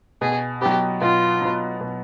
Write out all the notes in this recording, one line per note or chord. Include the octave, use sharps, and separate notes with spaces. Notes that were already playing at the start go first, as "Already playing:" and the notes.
B2 G#4
F#3 B3 G4
B2 F4
F#3 B3
B2